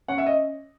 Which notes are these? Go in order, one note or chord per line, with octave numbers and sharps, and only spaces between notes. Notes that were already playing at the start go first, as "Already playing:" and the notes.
C#4 F#5
E5
D#5